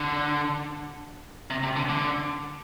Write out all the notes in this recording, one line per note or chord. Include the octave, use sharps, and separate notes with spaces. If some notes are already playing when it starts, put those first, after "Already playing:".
Already playing: D3
C3
C3
D3
D3